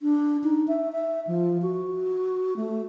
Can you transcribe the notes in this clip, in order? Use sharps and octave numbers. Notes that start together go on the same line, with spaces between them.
D4
D#4
E5
E5
F3
F#4
A3